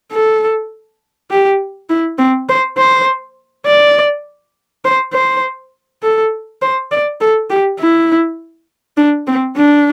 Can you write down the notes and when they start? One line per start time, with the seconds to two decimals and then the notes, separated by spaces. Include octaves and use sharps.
0.12 A4
1.31 G4
1.90 E4
2.18 C4
2.49 C5
2.78 C5
3.66 D5
4.85 C5
5.14 C5
6.03 A4
6.62 C5
6.91 D5
7.21 A4
7.50 G4
7.79 E4
8.98 D4
9.27 C4
9.57 D4